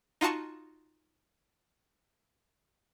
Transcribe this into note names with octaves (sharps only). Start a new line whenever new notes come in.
D#4 F4 F#4 A5 C#6